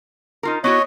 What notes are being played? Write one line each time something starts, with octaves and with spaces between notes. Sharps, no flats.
D#4 F4 A#4
B3 E4 F#4 C#5 D#5